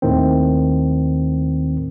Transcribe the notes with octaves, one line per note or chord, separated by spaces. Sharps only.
D#2 A2 D#3 C4